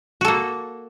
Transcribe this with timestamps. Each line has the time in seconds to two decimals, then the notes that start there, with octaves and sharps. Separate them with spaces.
0.21 F#4
0.25 A4
0.28 A#3